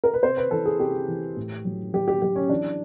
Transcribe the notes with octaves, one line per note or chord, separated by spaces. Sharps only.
A#4
B4
C3 C5
B4
E3 A4
G#4
C3 G4
E3
A2
F#3
F#3 G4
G4
F#3 G4
C#4
E3 D4